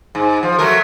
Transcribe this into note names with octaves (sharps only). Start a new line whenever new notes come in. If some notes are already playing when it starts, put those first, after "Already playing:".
G#2
F3
F#3 A3 A#4